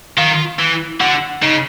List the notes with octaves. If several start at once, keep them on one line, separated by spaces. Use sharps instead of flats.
D#3 F4
E3
D3 F#4
C#3 D#4